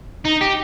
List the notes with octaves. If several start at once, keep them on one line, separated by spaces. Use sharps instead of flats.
D#4
G4